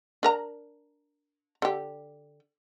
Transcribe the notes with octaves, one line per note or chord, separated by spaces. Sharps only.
D4 A#4 A#5
D3 G4